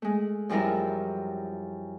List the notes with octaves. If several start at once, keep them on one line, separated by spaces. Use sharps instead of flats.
G#3 A3
F#2 F3 G3 E4 A#4